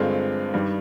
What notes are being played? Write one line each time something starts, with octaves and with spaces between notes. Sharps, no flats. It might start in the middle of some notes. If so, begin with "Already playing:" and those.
Already playing: G2 D3 G#3 C4 F4
G2 D#3 G3